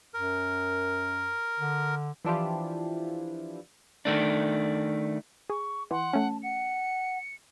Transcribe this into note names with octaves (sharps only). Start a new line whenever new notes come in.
F#2 A#4
D3
E3 F3 D4 E4 F4 G4
D#3 A3 D4
G#4 C#6
E3 F#5 C6
A3 C#4 A5
F#5 C#7